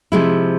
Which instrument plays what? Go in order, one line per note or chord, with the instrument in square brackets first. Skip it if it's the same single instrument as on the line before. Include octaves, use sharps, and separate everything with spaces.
[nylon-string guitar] C3 F3 G#3 E4